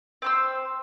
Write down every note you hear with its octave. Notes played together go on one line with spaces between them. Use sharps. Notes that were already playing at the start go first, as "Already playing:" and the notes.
C4 C5 E6